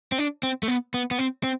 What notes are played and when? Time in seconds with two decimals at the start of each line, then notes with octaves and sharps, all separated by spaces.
0.12 C4
0.18 D4
0.43 C4
0.63 A3
0.68 B3
0.94 B3
1.11 B3
1.19 C4
1.44 C4